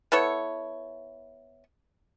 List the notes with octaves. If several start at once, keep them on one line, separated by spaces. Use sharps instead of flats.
B3 E4 A4 C#5